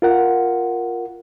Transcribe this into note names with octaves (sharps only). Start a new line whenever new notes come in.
F4 A#4 F#5